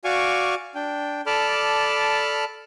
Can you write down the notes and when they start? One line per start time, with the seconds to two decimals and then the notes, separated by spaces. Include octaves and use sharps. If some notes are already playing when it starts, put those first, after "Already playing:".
0.04 F#4 D5 F5 G#5 C#6 D6
0.75 D4 G5
1.26 A4 D5 A5 B5 D6 F6